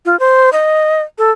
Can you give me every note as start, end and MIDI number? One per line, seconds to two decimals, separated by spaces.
0.05 0.19 65
0.20 0.50 72
0.53 1.02 75
1.18 1.31 69